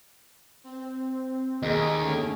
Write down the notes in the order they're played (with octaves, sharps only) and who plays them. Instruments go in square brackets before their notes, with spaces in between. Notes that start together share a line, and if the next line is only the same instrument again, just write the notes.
[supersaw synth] C4
[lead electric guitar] D#2 [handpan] A#3 G#4 D#5
[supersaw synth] D3 A3 C#4